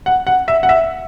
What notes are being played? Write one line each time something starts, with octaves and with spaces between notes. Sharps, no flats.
F#5
F#5
E5
F#5
E5